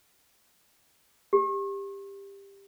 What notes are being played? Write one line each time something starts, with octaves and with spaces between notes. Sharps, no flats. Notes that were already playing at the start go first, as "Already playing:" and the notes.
G4